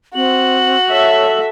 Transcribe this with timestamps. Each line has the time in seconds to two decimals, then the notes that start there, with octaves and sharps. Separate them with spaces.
0.15 C4 F#4 F#7
0.91 A4 C#5 E5